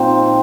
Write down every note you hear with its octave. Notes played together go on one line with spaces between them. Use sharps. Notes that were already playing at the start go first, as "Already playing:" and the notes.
Already playing: A#2 F3 A#3 C4 D#4